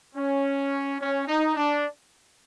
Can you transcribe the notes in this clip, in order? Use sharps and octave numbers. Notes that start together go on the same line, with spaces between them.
C#4
C#4
D#4
D4